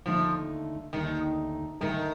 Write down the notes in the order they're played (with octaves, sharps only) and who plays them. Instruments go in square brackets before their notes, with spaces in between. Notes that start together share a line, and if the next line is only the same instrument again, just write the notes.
[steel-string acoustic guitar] D#2 D3 A3 D#4 [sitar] F3
[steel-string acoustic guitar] D#2 D3 A3 D#4 [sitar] D#3
[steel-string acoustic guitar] D2 D3 A3 D#4 A#4 [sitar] D#3